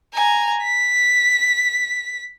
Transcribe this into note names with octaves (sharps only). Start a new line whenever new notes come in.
G#5 A#5
B6